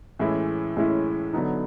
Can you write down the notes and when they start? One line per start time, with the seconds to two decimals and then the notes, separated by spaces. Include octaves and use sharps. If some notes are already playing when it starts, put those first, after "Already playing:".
0.19 A2 E3 G#3 C#4 E4
0.77 A2 E3 G#3 C#4 E4
1.33 D3 F#3 B3 D#4